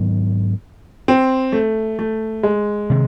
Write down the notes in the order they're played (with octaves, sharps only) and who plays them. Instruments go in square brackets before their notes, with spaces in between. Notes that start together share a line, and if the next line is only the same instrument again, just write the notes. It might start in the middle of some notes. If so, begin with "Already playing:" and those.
Already playing: [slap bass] G#2 D#3 F#3 B3
[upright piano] C4
A3
A3
G#3
[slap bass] C3 D#3